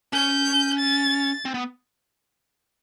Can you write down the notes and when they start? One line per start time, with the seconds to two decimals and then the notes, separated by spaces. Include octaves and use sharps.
0.13 C#4 G6
0.79 A6
1.45 C4
1.54 B3